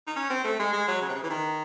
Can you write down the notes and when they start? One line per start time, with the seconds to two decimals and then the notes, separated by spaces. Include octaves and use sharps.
0.07 D#4
0.16 C#4
0.30 C4
0.44 A3
0.59 G#3
0.73 G#3
0.88 F#3
1.01 C#3
1.09 C3
1.16 C#3
1.23 E3
1.30 D#3